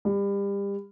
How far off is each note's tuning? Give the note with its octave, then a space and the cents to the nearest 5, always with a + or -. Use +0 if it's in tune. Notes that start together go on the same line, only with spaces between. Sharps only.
G3 +30